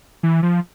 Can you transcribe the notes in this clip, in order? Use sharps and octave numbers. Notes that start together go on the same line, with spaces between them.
E3
F3